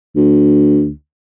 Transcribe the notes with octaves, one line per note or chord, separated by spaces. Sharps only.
D2